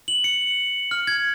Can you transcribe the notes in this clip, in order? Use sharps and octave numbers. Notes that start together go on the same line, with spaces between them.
F#7
C#7
F6
G#6